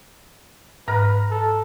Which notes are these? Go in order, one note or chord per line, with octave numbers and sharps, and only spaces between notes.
G#2 B4 A#5 F6 A#6
A4